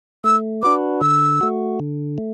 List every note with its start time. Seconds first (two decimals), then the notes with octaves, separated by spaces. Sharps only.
0.24 A3 E6
0.62 D4 F#4 B4 D6
1.01 D3 E6
1.41 A3 F#4
1.80 D3
2.18 A3